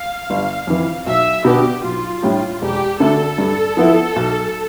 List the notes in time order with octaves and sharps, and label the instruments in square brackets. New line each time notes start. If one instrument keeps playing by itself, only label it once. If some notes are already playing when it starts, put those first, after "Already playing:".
Already playing: [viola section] F5
[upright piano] G1
F2 E3
[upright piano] B1 [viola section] E5
[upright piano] B2 B3 D4 [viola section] G4
[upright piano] B1 [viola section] F4
[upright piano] A2 G3 D4 G4
[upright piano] E1 [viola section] G4
[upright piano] D2 D3 A3 D4 [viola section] A4
[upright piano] G2
F3 B3 E4
B1